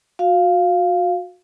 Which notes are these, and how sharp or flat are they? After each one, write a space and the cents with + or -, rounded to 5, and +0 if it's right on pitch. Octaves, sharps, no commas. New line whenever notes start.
F#4 -30 F5 +0